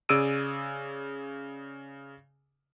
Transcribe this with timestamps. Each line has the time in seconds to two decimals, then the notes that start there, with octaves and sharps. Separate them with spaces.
0.09 C#3 G#4 D5 E6 D7 D#7